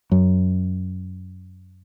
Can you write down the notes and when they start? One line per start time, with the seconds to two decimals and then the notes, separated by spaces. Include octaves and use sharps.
0.12 F#2